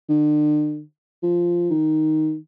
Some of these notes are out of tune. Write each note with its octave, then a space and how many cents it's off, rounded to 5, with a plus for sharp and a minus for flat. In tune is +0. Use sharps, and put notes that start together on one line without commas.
D3 +40
F3 -5
D#3 +0